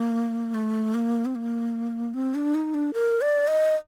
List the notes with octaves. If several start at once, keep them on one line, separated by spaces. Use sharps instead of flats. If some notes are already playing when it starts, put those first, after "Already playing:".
Already playing: A#3
A3
A#3
C4
A#3
C4
D4
D#4
D4
A#4
D5
D#5